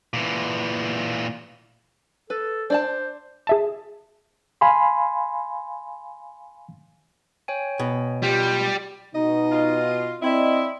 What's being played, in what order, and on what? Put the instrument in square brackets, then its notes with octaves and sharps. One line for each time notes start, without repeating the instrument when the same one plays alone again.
[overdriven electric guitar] A#2 E3
[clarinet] A4 [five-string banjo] B4
[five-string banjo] D4 D5 A5 [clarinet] C5
[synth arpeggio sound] G#4 E5 A5
[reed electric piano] F5 G#5 B5 C6
[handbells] C#5 G5 G#5
[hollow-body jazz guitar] B2
[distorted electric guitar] G3 [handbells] F4 G4
[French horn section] B2 [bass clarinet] D#4 [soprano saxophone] D#5
[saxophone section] F4
[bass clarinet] C4 [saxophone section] E4 [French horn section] D5 D#5